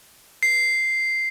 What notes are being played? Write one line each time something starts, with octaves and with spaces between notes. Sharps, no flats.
C7